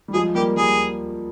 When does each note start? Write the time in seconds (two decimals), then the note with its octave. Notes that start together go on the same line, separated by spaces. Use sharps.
0.08 G3
0.13 F3 G#3 G#4
0.35 G3 A#3 G4
0.57 G3 A#3 G#4